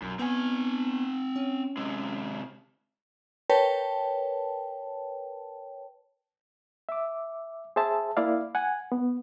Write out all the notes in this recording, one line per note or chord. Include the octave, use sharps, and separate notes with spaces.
B1 F#2
B3 C4 G#5
C#4
C3 G#3
A#4 B4 C#5 G5 A5
E5 D6
G#4 C5 E5 A5
A#3 E4 D5 F5
F#5 G#5
B3